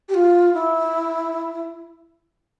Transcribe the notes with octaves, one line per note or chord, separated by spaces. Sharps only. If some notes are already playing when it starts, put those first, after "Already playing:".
G4
F4
E4